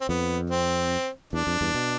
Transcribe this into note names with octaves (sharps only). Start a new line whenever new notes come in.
C4
F2 B3
C4
E2 D4
F2
E2 G2
B2